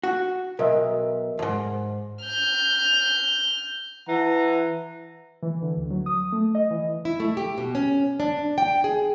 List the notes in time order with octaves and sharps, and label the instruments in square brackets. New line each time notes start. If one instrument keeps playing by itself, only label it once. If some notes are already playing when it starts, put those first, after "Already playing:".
[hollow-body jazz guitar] F#4
[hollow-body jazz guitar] B1 [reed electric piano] A#4 D#5 E5
[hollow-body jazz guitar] D#2 G#2
[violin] F6 G6
[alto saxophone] E3 [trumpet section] F#5 A5 A#5
[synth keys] E3
D3
D2
F#3
D#6
A3
D#5
E3
[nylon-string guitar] E4
A3
G4
B2
C#4
D4
G5
G#4